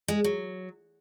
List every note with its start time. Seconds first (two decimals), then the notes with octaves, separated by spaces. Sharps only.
0.08 G#3
0.24 F#3